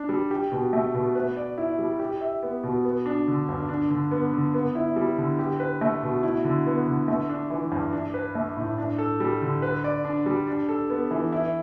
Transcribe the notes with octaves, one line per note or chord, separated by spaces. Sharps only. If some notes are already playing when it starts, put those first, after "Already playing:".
Already playing: D4
G3
G4
B2
A3
B2
B4
D5
E4
G3
G4
E5
B3
B2
B3
D4
D3
G2
D4
D3
B3
D3
B3
E4
G3
D3
G4
B4
A3
B2
E4
D3
B3
D3
A3
D4
E3
G2
D4
B4
A3
A2
D4
A4
G3
D3
B4
D5
D4
G3
D4
A4
B3
E3
E4